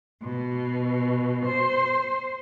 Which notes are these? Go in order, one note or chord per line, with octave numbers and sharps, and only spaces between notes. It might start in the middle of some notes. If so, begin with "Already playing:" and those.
B2
C5